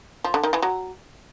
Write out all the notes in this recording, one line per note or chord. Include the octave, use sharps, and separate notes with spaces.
F3
D3
D#3
E3
F#3